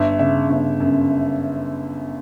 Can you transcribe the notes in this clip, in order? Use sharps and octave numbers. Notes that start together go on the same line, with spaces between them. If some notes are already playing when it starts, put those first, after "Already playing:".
Already playing: G1 E5
C#3 E5
G1
F#2